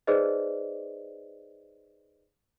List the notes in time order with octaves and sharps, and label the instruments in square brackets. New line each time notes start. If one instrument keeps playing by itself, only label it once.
[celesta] D#4 G#4 B4 C5 D5 D#5